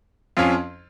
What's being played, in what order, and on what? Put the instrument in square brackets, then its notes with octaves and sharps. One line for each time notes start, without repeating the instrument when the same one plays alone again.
[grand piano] F2 F3 C#4 F4